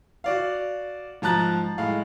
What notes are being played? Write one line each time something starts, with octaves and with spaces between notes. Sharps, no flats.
F#4 D5 F5
G#2 F3 A5 A#5 F#6 A6
A2 G#3 F5